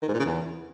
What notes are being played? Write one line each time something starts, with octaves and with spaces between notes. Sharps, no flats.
D#3
G#2
A#2
C#3
E2